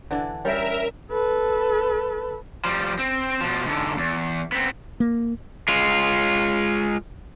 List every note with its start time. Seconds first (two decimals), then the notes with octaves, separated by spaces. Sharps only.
0.11 D3 E3 D4
0.45 G3 C#4 A#4 E5
1.11 A4 B4
2.65 F3 G3
2.99 C4
3.41 B2 F3
3.66 G#2 D3
3.97 E2
4.52 B3 C4
5.00 A#3
5.68 G#3 F4